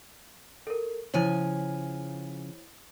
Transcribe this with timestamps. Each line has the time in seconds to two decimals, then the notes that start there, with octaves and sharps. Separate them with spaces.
0.67 A4 A#4
1.14 C#3 F3 E4 C5 C#5 G#5